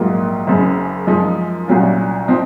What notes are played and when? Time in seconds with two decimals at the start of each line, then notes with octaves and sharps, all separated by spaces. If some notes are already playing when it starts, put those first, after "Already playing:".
Already playing: A#1 G#2 F#3 A#3 F4
0.47 F#1 F#2 C#3
1.07 F#2 F3 G#3 D#4
1.68 C2 A#2 F#3 C#4 F4
2.28 F3 C4 D#4